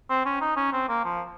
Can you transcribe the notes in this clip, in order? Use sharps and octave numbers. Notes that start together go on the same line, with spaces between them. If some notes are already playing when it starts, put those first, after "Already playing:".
C4
C#4
D#4
C#4
C4
A#3
F3